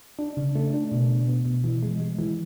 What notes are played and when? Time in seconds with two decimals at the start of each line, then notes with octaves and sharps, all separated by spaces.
0.19 D4
0.37 C#3
0.56 A3
0.73 D4
0.92 B2
1.09 B2
1.27 B3
1.45 B2
1.64 E3
1.83 G#3
2.00 G#3
2.19 E3